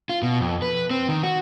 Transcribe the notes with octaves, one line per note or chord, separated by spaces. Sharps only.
F4
B2
F2
B4
C4
D#3
F#4